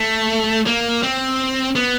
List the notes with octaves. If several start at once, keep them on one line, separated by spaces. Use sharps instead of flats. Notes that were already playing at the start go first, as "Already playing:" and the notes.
Already playing: A3
A#3
C4
B3